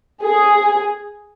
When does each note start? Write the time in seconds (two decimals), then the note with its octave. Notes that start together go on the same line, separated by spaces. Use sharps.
0.23 G#4